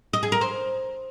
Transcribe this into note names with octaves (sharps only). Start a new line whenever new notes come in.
D#5
G#4
A#4
C5